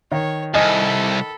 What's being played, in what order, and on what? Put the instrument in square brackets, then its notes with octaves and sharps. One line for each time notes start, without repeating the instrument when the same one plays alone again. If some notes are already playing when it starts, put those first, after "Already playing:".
[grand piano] D#3 [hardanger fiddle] C#5
[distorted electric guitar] C2 G2 [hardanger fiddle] A4 B5 [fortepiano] D#5 G#5